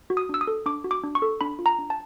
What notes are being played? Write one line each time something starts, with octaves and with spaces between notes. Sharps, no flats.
F#4
D#6
D4 E6
D#6
A4
D4 D6
F#4
D6
D4
C#6
A4
D4 B5
F4
A#5
D4
A5